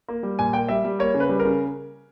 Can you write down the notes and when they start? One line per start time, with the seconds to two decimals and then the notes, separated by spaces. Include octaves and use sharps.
0.08 A#3
0.23 G3
0.39 A#2 G#5
0.53 A#3 G5
0.69 G3 E5
0.85 G3
0.99 A#3 C#5
1.14 C#3
1.20 B4
1.29 G3
1.40 A#4
1.45 C#3